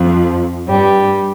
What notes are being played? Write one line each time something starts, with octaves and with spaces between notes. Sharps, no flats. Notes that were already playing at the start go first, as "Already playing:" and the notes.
Already playing: F2 F3
G2 G3